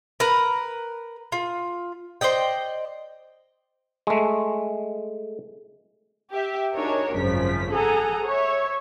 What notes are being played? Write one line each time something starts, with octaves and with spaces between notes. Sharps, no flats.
A#4 B4 A#5
F4
C5 D5 D#5 G5
G#3 A3
G4 E5
D4 D#4 F#4 G#4 A#4 C#5
G#1 F#2 C#3 F3 B6
G#4 A4 F#5 G#5 A#5
C#5 E5